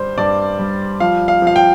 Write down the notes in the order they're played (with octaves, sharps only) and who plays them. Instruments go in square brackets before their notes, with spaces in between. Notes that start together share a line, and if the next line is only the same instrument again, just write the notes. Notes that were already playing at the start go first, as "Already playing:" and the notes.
Already playing: [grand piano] G2 G3 C5
G2 D5
G3
F3 F5
F5
F3 F5
G5